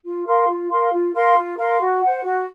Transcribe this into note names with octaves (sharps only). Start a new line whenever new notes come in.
F4
A#4 F5 C6
F4
A#4 F5 C6
F4
A#4 F5 C6
F4
A#4 F5 C6
F#4
C5 F#5
F#4